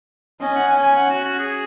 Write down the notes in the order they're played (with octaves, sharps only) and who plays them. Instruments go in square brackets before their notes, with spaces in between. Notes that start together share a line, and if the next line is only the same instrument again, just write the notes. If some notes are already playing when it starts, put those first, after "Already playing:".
[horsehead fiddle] C#4 [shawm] D#5
[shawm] F#5
G#5
G#5
F#5
F#4
F#4
G#4